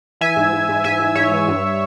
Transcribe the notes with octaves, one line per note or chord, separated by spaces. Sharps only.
E3 E5 G#5
G#2
G#2
G#2
G#2 E5 G#5
G#2
G#2 C#5 E5
E3
G2